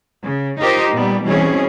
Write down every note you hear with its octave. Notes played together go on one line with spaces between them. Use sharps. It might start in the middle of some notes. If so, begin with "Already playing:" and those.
C#3
D#4 F4 G4 A#4 C5 D#5
A#2 G3 B3
B2 E3 G3 C4 C#4 G#4